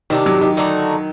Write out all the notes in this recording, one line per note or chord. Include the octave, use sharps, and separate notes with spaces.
C3 D#3 G3 D4
F#3
D#3
D3 A3 D#4 F#4